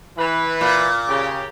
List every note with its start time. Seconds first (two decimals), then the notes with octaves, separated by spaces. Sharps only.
0.17 E3 B4
0.61 A#2
1.08 C#3 G4